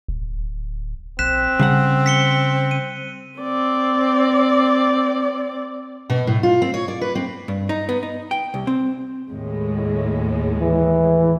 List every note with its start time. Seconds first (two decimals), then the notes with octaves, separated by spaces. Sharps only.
0.08 D1
1.19 A#1 C4 F#6 B6 E7
1.60 C#3 G3 F5 F#5
2.06 B6 C#7 G7
2.71 D#7
3.39 C4 D5
6.10 B2
6.27 A2
6.43 F4
6.62 C4
6.74 C#5
6.88 D5
7.01 B4
7.15 C4
7.48 G2
7.69 D#4
7.89 B3
8.03 D#4
8.31 G5
8.54 C2
8.67 C4
9.30 D#2 A2 G#3
10.60 E3